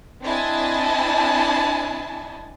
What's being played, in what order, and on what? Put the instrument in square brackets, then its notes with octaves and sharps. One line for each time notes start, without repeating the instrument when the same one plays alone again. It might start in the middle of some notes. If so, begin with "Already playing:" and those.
[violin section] C4 D4 E4 D#5 G#5 A5